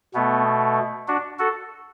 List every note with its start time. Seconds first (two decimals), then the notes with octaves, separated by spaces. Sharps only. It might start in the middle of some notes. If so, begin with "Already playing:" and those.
0.14 B2 A3 B3
1.08 D4 F#4
1.39 F#4 A4